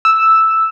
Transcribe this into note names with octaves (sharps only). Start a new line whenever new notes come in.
E6